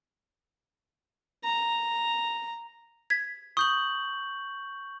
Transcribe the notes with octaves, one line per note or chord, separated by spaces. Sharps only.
A#5
G#6 B6
C#6 D#6 G6 F#7